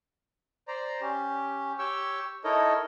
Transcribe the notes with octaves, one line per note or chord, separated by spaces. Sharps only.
C5 D5 A#5
C#4 G4
G4 C#5 G5 C#6 E6
D#4 E4 A4 A#4 C#5 D#5